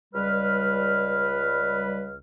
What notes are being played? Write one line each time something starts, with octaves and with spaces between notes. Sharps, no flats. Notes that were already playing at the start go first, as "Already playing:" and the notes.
C#2 G3 B4 F6